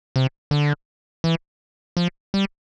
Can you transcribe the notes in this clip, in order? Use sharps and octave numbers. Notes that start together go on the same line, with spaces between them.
C3
D3
E3
F3
G3